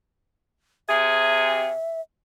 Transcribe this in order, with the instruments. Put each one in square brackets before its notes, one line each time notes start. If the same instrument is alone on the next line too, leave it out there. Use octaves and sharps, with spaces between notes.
[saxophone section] C3 G#4 [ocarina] E5